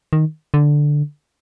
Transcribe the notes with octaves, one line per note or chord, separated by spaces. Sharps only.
D#3
D3